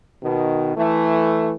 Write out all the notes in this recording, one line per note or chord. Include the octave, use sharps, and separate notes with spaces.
B2 D#3
E3 A3